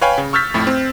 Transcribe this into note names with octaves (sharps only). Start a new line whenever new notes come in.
B4 C#5 F5 G5 G#5 B5
C#3
C#6 E6 F6 G6 A6 B6
F2 A2 A3
C4